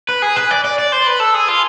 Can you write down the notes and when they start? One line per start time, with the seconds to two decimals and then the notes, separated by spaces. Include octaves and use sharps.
0.09 B4
0.22 G#4
0.36 B4
0.51 D5
0.65 D5
0.79 D5
0.92 C5
1.07 B4
1.20 A4
1.34 G#4
1.48 F4